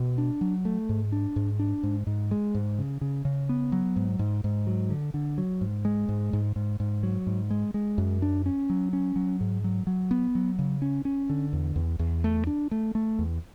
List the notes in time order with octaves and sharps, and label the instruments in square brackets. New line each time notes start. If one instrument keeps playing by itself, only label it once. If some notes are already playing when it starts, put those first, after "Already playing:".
Already playing: [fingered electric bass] B2
D4
F#3
A3
G#2
D4
G#2
D4
G#2
G#2
G#3
G#2
C#3
C#3
C#3
B3
F#3
G#2
G#2
G#2
F#3
D3
D3
F#3
G#2
G#3
G#2
G#2
G#2
G#2
F#3
G#2
G#3
G#3
F#2
D4
C#4
F#3
C#4
F#3
G#2
F#3
F#3
B3
F#3
C#3
C#4
C#4
D3
E2
E2
E2
A3
D4
A3
A3
E2